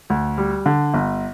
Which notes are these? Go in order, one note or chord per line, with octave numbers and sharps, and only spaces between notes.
D2
G3
D3
G1